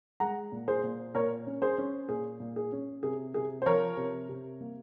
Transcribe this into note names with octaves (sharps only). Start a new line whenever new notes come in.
G#3 F#5 A#5
A#2
G#4 C5
A#2
A#2 A#4 C#5
C#4
G#4 C5
C#4
A#2 G#4
A#2
G#4
C#4
C3 G#4
C3 G#4
C5
F3 A#4 C#5
C3
C3
A#3